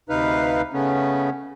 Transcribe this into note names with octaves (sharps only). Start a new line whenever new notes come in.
D2 C3 D#4 B4 F5
C#3 A3 B3 C#4